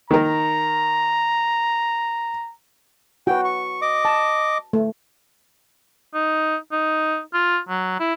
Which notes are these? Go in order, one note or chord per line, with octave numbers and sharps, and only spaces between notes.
D#3 A#4 A#5
F#4 B4 G5
C#6
D#5 D6
A5
A3
D#4
D#4
F4
F#3
E4